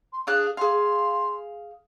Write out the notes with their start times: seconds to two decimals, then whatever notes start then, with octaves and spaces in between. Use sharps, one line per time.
0.12 C6
0.27 D4 G#4 F5 F#6
0.57 G#4 F5 C6